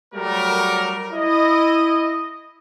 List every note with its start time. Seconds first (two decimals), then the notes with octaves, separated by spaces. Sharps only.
0.14 F#3 G3 A3 A#4
1.12 E4 D#5